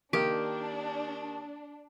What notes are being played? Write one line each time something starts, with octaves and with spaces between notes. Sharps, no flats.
D#3 A#3 D4 G4